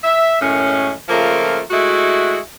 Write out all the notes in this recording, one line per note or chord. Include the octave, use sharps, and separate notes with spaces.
E5
F#2 A2 D#3 G#3 C#4
C#3 F3 A3 A#3 F4 A#4
G#3 A3 E4 F#4